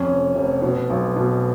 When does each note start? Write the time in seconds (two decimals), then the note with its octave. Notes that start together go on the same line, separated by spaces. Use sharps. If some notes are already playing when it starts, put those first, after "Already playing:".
Already playing: F2 C#4
0.08 F1
0.35 F1
0.62 B2
0.90 B1
1.16 B2